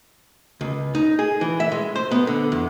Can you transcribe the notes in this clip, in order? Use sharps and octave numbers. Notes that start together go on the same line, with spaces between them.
C#2
D#4
G#4
E3
E5
G#3
C5
B3
D3
E2